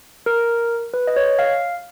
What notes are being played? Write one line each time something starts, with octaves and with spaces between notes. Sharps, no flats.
A#4
B4
D#5
C#5
F5